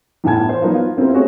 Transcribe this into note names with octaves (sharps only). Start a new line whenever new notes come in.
E2 A2 F4 G#5 A5 G#6
C5
F3 F#3 A#3 B3 D#4 F4
F4
A#3 C4 E4 G4 A#4
A3 C4 F4 F#4 G#4 C#5